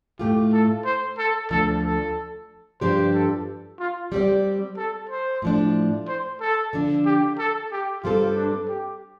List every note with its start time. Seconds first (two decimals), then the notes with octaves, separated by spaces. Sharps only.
0.19 A2 A3 F4 G4
0.53 A4
0.85 C5
1.18 A4
1.50 D2 D3 F3 A4
1.83 A4
2.81 G2 F3 D4 G4 C5 D5
3.14 A4
3.79 F4
4.12 G3 C4 G4 D5
4.77 A4
5.10 C5
5.42 A2 F3 D4
6.08 C5
6.41 A4
6.73 D3 F3 D4
7.05 G4
7.38 A4
7.71 G4
8.04 G2 G3 C4 F4 A4
8.36 D4
8.69 G4